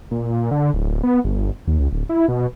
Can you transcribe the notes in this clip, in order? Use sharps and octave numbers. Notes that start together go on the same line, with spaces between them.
A#2
D3
D1
B3
G1
D#2
C#2
D1
E4
B2